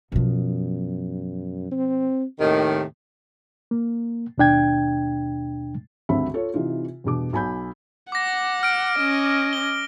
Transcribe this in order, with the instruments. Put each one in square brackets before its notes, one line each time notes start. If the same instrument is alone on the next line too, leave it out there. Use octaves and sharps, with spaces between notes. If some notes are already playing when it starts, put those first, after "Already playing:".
[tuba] F#2 [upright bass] B2 F3
[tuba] C4
[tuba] D#2 [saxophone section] A2 C3 D#3
[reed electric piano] A#3
D#2 B2 D4 G5 G#6
[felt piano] G#1 D2 G2 C4 E5 B5
F4 A4 C#5
C3 E3 D#4 F4
E2 G2 B2 D6
B1 G#5 B5 G6
[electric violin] F#5 [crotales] D6 A#6
[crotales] F6 D7
[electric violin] C#4 D#5
[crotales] G7